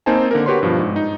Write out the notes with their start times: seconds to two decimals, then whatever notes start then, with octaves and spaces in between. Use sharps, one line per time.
0.06 A#3 C4 D#4 C5 G#5 A5
0.31 D3 A#3 A#4
0.46 F#4 G4 B4 C#5 C6
0.63 G2 B2 F3
0.79 G#2
0.96 D#4